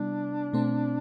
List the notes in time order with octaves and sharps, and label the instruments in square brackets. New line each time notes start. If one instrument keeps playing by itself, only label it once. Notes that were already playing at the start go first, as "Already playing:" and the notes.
Already playing: [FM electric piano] C3 G3 B3 E4 [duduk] D4
[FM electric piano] B2 A3 C4